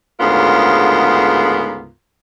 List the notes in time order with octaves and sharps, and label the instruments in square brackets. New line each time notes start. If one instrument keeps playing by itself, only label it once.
[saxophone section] D2 G#2 C#3 B3 F4 A#4